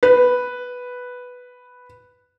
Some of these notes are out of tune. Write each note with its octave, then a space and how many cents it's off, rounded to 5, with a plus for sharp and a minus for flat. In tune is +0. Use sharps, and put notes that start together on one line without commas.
B4 +0